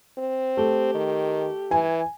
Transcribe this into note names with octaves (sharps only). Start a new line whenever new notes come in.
C4
A3 G4
D#3
E3 G#5